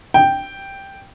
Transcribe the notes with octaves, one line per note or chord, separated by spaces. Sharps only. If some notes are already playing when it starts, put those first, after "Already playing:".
G5